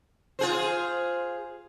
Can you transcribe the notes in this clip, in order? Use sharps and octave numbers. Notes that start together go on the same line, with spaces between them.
F4 G#4 C5